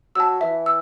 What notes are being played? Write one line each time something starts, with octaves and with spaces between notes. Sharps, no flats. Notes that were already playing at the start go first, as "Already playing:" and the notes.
F#3 A5 E6
E3 E5
E6